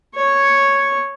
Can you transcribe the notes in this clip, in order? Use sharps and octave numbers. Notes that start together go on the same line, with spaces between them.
C#5 C#6